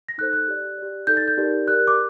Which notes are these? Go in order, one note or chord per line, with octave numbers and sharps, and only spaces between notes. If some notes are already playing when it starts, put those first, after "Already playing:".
A#6
D#4 A4 C5 F#6
F#6
G4 D5
G4 D5
D#4 A4 D5 G6
A6
G6
D#4 G4 A#4 D5
G4 A#4 D5 F#6
D6